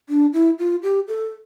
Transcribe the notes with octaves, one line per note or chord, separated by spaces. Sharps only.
D4
E4
F4
G4
A4